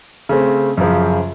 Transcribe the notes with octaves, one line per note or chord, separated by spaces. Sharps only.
C#3 A3 C4
F#2 C#3 F3